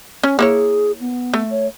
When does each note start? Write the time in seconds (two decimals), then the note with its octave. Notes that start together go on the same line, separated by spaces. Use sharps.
0.24 C#4
0.39 A#3 E4 G#4 C#5
1.01 B3
1.34 A3
1.51 C#5